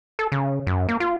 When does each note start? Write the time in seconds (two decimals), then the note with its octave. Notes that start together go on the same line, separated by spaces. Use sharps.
0.19 A4
0.32 C#3
0.67 F#2
0.89 A#3
1.00 F4